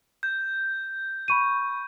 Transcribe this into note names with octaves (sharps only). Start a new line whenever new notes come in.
G6
B5 C#6 D#7